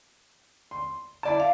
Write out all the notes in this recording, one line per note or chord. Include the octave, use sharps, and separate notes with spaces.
C6
E4 D5 A5
F5